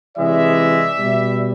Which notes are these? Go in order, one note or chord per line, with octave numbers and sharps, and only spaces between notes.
C3 E3 G#3 D5 E5
B2 G3